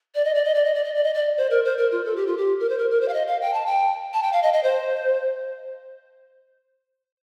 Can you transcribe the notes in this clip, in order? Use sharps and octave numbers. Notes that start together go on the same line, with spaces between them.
D5
D#5
D5
D#5
D5
D#5
D5
D#5
D5
D#5
D5
C5
A#4
C5
A#4
F4
A4
G4
F4
G4
A#4
C5
A#4
A#4
C5
F5
D#5
F5
G5
A5
G5
A5
G5
F5
D#5
D#5
C5